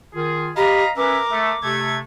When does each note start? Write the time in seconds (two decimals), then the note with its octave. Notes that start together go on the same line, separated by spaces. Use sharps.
0.15 D#3 F4 G#4
0.57 G4 D#5 F5 A#5 B5
0.97 C#4 A#4 B4 E5 D6
1.31 A3
1.64 C3 A3 G#6